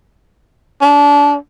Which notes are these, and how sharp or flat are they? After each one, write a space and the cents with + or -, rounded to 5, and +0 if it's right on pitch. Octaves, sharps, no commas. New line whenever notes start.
D4 -25